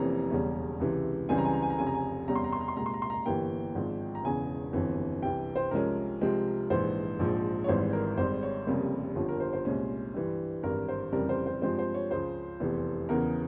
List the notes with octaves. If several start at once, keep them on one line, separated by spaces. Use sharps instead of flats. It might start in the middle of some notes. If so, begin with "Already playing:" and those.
Already playing: F1 F2 E3 A#3 C#4 A#5
E1 E2 C#3 G3 C#4
C#2 C3 E3
C#2 C#3 E3 G3 C4 G#5
A#5
G#5
A#5
G#5
A#5
F1 F2 C#3 G#5
A#5
G#5
E2 C3 G3 C#4 A#5
C6
A#5
C6
A#5
C6
C2 A#2 G#3 A#5
C6
A#5
C6
A#5
G1 G2 E3 A#3 G5
G#1 G#2 F3
A#5
E1 E2 C#3 E3 G#5
G1 F2 E3
C2 C3 E3 G5
C5
C2 C3 F3 G#3 C#4 A#4
C2 C3 F3 G#3 C4
A#1 G#2 E3 C5
A#1 G#2 F3
C#5
G#1 G#2 E3 G3 C5
A#4
G#1 G#2 G3 C5
C#5
F1 F2 C#3 G3 A#3
G1 G2 F3
A#4
C5
C5
C2 A#2 G#3 C#4
G2 E3 G3
G#1 G2 E3 A#4
C5
F1 F2 C#3 E3 G3 A#4
C5
C5
G2 F3 G#3 C4 C5
C5
C#5
C#2 C#3 F3 C5
F1 E2 E3
E2 C#3 E3 A#4